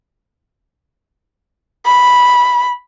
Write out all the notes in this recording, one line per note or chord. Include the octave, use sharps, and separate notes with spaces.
B5